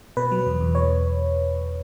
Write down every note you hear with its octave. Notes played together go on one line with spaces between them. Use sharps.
B2 B4
F#3
E2
E2
B2 C#5